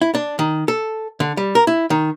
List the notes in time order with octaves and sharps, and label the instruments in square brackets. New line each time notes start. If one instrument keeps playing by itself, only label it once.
[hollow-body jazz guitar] E4
D4
D#3
A4
D3
G3
A#4
E4
D#3